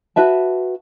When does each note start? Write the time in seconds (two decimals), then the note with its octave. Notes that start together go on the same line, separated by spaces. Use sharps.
0.16 F#4 B4 E5 A5